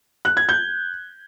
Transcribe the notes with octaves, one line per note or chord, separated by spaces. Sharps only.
F#6
G#6
G6